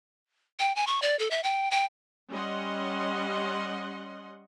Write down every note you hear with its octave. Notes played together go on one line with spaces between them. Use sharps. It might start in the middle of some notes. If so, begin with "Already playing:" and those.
G5
G#5
C#6
D5
A4
E5
G5
G5
G3 C#4 D#5 F#5 C6